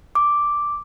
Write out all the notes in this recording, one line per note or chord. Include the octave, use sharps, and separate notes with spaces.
D6